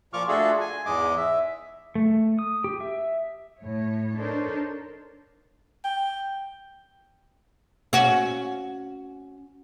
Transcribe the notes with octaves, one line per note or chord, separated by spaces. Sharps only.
A#2 F3 F4 C#6 D6 F6
A3 D4 F4 F#4 G#4 A4
G#5
E2 G#2 G#3 D#5 D6
E5
A3
D#6
G4
E5
A2 C#5
D4 D#4 A4 A#4 C5 C#5
G5
C#4 F#4